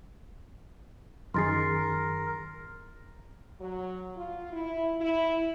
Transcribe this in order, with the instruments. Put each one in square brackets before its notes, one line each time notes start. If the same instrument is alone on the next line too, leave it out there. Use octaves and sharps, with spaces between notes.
[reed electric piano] F#2 D#3 G#4 [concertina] A#4 [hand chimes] C6 A6 C7
[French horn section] F#3
F4
E4
E4